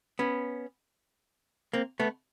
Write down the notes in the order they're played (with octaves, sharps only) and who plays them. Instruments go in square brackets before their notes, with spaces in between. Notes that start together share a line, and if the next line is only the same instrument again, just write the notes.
[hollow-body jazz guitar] B3 C#4
A#3 C4
A3 B3